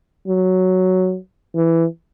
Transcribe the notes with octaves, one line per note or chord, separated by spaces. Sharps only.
F#3
E3